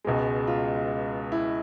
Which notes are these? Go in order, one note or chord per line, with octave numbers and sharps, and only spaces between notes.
C#2 B2 G#3
F4
E4